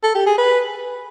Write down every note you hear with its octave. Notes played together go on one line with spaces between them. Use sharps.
A4
G4
G#4
B4